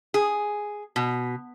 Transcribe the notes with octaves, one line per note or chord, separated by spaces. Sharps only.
G#4
B2